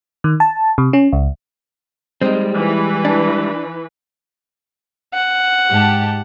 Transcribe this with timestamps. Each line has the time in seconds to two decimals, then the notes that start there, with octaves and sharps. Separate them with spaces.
0.24 D#3
0.40 A5
0.78 C3
0.93 C#4
1.13 C#2
2.22 G3 G#3 C4 D#4
2.55 E3 B4
3.05 D4
5.14 F#5
5.71 G#2 G4 A5